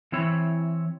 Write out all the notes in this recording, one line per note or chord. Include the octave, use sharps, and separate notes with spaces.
E3 C4 E4 C#5